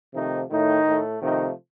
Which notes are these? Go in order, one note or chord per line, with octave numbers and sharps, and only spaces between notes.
C3 D#3 F3 A3 D#4
A2 D#3 A3 D#4
A2 A3
C3 D#3 F3 A3 D#4